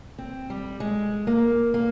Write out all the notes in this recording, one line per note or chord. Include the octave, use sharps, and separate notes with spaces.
C4
G3
G#3
A#3
A#3